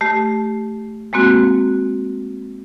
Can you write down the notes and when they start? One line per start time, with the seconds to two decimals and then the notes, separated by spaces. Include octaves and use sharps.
0.01 A3 G4
1.13 G#3 A#3 C4 F#4